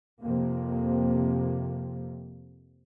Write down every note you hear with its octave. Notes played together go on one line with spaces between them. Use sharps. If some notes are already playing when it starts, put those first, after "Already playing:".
F2 C3 A#3